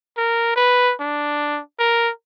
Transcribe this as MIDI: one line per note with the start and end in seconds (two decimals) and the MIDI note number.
0.17 0.52 70
0.56 0.93 71
1.00 1.60 62
1.79 2.11 70